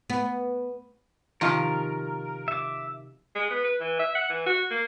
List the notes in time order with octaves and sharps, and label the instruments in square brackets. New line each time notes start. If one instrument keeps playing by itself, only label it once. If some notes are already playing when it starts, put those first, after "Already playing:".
[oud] B3
[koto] C3 F3 [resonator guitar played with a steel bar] D#3 F4 [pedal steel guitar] A#4
[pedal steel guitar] E5 D6
[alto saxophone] G#3
B3
B4
E3
E5
F#5
E3
F#4
A#3